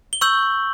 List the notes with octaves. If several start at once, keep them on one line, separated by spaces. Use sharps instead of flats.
G7
C#6 E6 G6 F#7